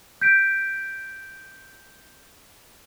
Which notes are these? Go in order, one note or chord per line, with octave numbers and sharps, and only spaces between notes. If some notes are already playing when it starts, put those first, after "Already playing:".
G6 B6 D7